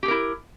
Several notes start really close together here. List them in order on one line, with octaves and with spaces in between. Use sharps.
G4 G#4 A#4 E4